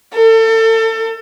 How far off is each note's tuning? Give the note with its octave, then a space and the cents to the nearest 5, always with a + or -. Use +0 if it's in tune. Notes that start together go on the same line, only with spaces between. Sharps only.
A4 +30